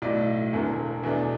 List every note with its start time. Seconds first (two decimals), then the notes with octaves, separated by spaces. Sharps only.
0.02 B1 A2 F#3 D5
0.53 E1 E2 D3
1.03 E2 B2 A3 D4